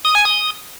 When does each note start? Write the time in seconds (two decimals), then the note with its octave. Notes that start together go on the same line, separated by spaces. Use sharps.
0.05 D#6
0.15 G#5
0.25 D#6